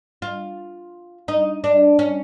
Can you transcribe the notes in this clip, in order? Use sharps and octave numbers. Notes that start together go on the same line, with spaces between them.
F4
D#4
D4
C#4